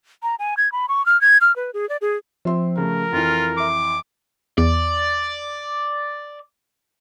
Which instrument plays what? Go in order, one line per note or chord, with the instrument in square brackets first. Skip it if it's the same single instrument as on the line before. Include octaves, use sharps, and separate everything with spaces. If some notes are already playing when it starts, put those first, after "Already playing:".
[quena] A#5
G#5
G#6
B5
C#6
F6
G#6
F6
B4
G#4
D5
G#4
[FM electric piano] F3 [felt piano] C4 E5 C6
[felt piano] C#3 A3 [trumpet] A#4
[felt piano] F2 E3 [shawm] F4
[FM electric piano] E5 C6 [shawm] D6
[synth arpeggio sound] E2 [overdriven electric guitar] D5